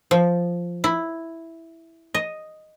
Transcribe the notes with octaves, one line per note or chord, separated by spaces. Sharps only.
F3
E4
D#5